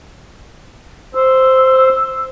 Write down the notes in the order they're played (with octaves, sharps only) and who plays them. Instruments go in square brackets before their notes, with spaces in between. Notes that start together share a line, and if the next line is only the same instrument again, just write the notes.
[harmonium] C5 [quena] E6